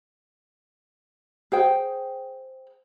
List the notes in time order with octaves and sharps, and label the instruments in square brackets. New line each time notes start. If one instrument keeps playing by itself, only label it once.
[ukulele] G#4 C5 G5